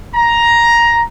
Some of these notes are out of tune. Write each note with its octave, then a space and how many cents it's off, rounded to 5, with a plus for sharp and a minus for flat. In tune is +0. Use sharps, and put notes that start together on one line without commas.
A#5 +10